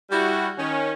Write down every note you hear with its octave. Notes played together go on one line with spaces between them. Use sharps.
G3 E4 F#4
D#3 C#4